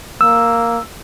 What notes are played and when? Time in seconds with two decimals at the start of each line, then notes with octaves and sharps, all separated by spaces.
0.21 A#3 E6